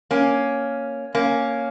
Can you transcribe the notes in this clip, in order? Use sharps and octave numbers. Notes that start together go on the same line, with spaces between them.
A#3 C#4
A#3 C#4